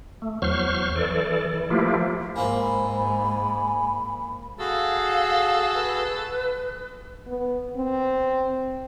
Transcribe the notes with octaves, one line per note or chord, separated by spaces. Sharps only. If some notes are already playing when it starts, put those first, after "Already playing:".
A3
E2 F#3 C5 C#6 F6
E3 A4 D5
E3
F3 A3 A#3 E4 F4 G4
G#2 A#3 C4 G#5 B5
F#4 G#4 A4 F5
B4
B3
C4